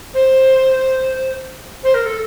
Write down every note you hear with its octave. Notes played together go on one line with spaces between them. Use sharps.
C5
C5
A#4
A4